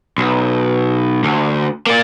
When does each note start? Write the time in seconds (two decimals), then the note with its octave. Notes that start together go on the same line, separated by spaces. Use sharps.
0.18 B1
1.24 D2
1.87 A#3 D5